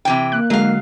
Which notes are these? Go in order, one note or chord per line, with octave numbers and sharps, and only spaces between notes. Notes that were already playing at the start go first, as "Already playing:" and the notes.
C3 E3 G5
A#3 F#6
D3 F#3 G#3 F5